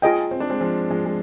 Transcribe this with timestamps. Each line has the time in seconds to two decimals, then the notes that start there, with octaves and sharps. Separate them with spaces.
0.02 F4 G#4 D#5 G5
0.31 C4
0.40 D4
0.50 G#3 C4
0.61 F3 G#3
0.90 F3 G#3
1.05 G#3